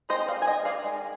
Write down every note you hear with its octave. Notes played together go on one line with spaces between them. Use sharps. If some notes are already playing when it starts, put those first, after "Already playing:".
G#3 C4 D#4 C5 D#5
D5 F5
G#5
D#5 G5
D5 F5
D#3 G#3